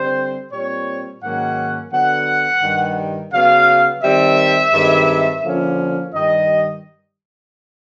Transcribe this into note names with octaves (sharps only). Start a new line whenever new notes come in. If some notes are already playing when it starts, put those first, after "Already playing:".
Already playing: D3 G3 C4 C5
A#2 G3 C4 C#5
G#2 D#3 F#3 A#3 C#4 F#5
D3 F#3 B3 F#5
G2 D#3 G3
C#3 F#3 B3 F5
D#3 G3 C4 E5
G2 D#3 G#3 C4
D3 F3 A#3 C#4
G2 D#3 G3 D#5